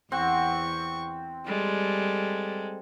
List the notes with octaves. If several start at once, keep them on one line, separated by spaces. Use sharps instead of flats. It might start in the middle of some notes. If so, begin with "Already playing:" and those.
E2 C4 F#5 C#6
G3 G#3 A4